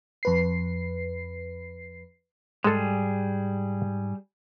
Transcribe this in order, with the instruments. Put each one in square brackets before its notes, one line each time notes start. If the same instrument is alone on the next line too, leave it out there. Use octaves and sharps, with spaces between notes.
[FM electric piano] F2 B4 C7
[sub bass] G#2 [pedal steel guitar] G3 G#4 [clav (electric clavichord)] G#3 A4